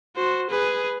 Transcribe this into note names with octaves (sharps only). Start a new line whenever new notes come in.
F#4 C5
G#4 B4